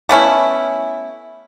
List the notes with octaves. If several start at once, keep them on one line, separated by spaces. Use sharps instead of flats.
A3 B3 C#4 E4